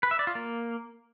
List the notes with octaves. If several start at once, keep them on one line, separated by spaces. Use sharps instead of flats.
B4
E5
D5
F4
A#3